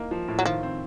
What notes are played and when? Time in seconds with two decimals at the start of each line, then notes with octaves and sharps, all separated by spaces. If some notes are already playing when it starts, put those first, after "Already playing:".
Already playing: E3 A#3 D#4
0.11 F3
0.28 A2
0.39 F#3
0.46 D#3 F3
0.63 C4